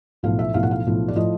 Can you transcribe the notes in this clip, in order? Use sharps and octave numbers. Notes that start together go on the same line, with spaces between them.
B1 A2 F3 F5
E5
B1 A2 F3 F5
F#5
F5
B1 A2 F3
D5
A2 F3 D#5